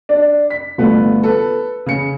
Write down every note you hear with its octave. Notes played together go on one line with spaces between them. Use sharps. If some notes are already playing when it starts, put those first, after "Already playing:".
D4
B6
G1 F3 A3 B3 B4
A4 B4
C#3 C#7